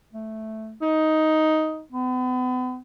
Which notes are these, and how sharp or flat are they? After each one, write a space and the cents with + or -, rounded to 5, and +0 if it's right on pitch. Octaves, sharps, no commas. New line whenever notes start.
A3 -5
D#4 +10
B3 +40